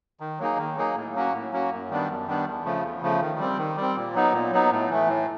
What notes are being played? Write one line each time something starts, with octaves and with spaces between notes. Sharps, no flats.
D#3
F#3 A#3 D#4 G#4
D#3
F#3 A#3 D#4 G#4
A2
F#3 A#3 C#4 F#4
A2
F#3 A#3 C#4 F#4
F#2
D#3 G3 B3 D4
F#2
D#3 G3 B3 D4
E2
C#3 F3 A3
E2
C#3 F3 A3
D#3
G3 C4
D#3
G3
C4
A#2
F#3 B3 D#4
A#2
F#3 B3 D#4
A2
E3 A3
A2